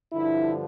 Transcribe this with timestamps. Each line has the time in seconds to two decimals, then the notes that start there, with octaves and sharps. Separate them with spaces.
0.13 G2 D3 F3 E4